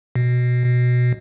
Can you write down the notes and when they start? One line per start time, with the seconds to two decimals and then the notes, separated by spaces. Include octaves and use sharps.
0.16 B2
0.64 B2